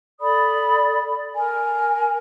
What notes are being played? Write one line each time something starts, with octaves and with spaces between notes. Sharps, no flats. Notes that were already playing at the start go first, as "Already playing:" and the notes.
A4 D5 B5 D#6
A#4 G#5